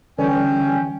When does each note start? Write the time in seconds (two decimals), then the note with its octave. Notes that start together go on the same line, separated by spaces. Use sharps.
0.19 D3 E3 G3 C#4 G5